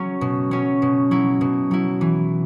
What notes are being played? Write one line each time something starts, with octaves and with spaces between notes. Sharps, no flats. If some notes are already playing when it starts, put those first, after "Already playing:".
Already playing: F#3 C#4
B2
F#3 C#4
B2
F#3 E4
B2
F#3 E4
E3